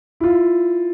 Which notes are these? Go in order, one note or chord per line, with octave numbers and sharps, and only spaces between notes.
E4 F4